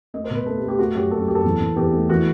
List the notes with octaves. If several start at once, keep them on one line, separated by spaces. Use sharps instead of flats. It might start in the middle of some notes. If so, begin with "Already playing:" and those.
A3 D#5
C5
B2
B4
A3 A4
G4
A3
G4
A3 F#4
F#2 G4
F#2 A4
F#4
F#2 G4
A4
E2
E2
E2 G4
A3
E3 F#4